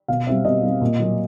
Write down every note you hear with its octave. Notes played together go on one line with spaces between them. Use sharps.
B2 F5
G3 C4 E5
B2 D#5
G3 C4
A#2
F#3 A#3